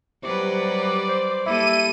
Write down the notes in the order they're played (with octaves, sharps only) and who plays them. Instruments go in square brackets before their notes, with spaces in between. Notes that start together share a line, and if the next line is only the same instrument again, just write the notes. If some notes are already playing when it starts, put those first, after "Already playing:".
[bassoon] C3 [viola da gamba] F#3 G3 B4 [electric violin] D5
[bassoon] C5
[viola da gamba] G3 A#3 A4 [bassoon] E4 [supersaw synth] D#7